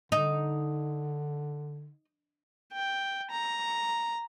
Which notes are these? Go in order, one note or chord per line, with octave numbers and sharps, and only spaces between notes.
D3 D#4
G5
A#5